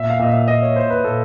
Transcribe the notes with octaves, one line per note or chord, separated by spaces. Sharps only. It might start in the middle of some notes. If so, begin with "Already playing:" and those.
Already playing: A#2 E5
F5
A#2 D#5
E5
A#2 D#5
C#5
A#2 C5
B4
A#2 A4